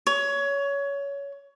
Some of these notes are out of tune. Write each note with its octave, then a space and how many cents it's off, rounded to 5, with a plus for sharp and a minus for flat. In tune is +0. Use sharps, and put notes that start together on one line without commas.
C#5 +20